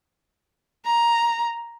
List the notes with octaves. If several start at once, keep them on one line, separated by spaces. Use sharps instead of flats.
A#5